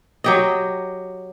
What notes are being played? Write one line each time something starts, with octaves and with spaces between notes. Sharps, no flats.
F#3 G4 D#5